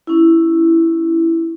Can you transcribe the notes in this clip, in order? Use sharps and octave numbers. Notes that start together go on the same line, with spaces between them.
C#4 E4